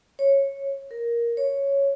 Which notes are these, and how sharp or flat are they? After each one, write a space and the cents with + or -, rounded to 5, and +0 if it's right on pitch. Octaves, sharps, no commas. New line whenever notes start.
C#5 -10
A#4 +10
C#5 +0